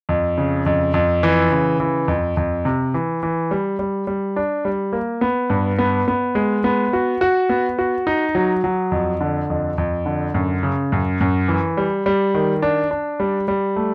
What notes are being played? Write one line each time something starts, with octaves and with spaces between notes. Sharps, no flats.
F2
C#3
F2
F2
E3
C#3
E3
F2
F2
C3
E3
E3
G3
G3
G3
D4
G3
A#3
B3
G2
B3
B3
G#3
B3
F#4
F#4
B3
F#4
D#4
F#3
F#3
F2
D3
F2
F2
D3
F#2
C#3
F#2
F#2
E3
G3
G3
D#3
D4
D4
G3
G3
A3